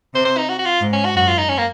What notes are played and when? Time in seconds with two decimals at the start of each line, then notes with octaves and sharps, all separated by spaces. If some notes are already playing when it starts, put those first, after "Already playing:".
0.14 C3 C5
0.25 C5
0.37 D#4
0.49 F#4
0.59 F#4
0.65 F4
0.82 G#2
0.93 C#4
1.05 F#4
1.15 F#2 F#4
1.27 F4
1.38 D#4
1.49 C#4
1.58 A#3